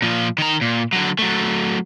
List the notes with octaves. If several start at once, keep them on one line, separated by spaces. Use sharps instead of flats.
A#2 F3
D#3 A#5
A#2
D3 F#3
F#3 A3